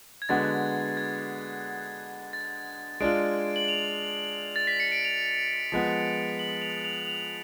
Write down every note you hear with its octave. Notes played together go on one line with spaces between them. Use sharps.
G#6
D3 G#3 B3 F#4 A6
G#6
A6
G#3 D4 F4 D7
F#7
F7
A6
B6
C#7
D7
F7
F3 G#3 B3
F#7
F7
F7
F7